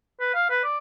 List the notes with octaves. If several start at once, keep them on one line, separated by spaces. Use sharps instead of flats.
B4
F5
B4
D5